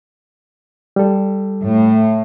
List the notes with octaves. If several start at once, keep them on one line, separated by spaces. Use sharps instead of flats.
G3 A4
A2